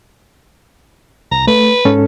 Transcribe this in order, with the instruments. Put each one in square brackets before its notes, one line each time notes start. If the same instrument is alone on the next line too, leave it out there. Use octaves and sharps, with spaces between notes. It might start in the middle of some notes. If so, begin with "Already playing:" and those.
[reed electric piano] C2 [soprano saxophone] A#5
[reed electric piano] A3 [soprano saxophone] B4
[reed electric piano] G#2 C#4 A4